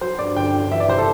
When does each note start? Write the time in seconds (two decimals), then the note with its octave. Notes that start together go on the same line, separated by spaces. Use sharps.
0.01 F#3 C5
0.19 G2 D5
0.36 G1 G5
0.54 G1
0.71 E3 E5
0.80 D5
0.88 C3 C5
0.98 A4